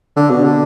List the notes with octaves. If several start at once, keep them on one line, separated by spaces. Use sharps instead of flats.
D3
B2
D3